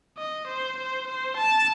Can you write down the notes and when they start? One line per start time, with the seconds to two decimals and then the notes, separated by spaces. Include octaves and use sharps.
0.18 D#5
0.48 C5
0.78 C5
1.08 C5
1.37 A5